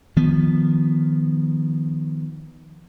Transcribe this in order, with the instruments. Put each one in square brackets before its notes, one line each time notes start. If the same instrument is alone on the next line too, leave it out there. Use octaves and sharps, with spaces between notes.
[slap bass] D#3 F3 B3